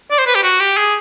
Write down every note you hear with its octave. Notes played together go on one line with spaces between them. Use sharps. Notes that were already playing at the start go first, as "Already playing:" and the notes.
D5
C5
B4
G4
F#4
G4
G#4